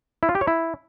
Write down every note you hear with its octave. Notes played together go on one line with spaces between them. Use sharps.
E4
F4
G4
C#5
E4